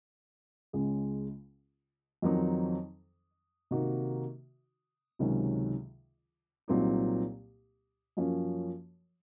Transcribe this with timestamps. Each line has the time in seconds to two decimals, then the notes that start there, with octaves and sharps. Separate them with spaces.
0.73 C#2 C#3 G#3
2.22 F2 D#3 F#3 C4 D#4
3.71 C3 D#3 A#3 D#4 F#4
5.19 C#2 C3 D#3 F#3 C#4
6.68 C2 A#2 F#3 C4 D#4
8.17 F#2 F3 A#3 C#4